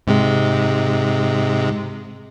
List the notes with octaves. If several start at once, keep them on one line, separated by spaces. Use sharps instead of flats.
G#2 C3 G#3